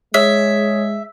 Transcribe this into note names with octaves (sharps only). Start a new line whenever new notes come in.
G#3 G#4 C#5 E5